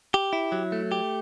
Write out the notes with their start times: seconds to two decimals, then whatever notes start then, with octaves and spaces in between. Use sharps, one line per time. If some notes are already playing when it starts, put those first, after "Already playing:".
0.14 G4
0.33 E4
0.52 F#3
0.72 A3
0.92 G4